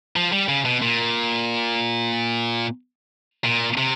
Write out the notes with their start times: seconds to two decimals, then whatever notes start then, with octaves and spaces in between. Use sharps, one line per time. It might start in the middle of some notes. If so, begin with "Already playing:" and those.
0.16 F3
0.32 G3
0.49 C#3
0.65 B2
0.82 A#2
3.44 A#2
3.78 C3